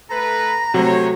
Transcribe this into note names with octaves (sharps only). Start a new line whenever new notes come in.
A3 A4 B4 A#5
C3 F#3 A3 A4 C5 C#5